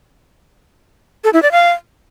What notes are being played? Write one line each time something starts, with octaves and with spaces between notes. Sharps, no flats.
A4
E4
D5
F5